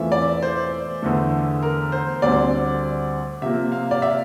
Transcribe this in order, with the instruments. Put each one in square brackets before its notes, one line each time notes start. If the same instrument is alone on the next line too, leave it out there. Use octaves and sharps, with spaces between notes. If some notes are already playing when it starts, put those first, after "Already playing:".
Already playing: [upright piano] E2 E3 A3 C4 F4 [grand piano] E5
[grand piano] D5
C5
[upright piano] E2 D3 A3
[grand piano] A#4
C5
[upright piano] D2 D3 G3 C4 [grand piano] D5
[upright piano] C3 F3 A#3 [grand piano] E5
[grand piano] F5
D5
E5